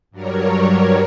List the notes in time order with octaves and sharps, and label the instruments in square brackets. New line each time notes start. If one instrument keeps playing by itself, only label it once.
[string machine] G2 F#3 G3 A#4 C#5